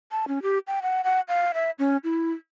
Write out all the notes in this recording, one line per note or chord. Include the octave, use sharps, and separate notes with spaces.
A5
C#4
G4
G5
F#5
F#5
F5
E5
C#4
E4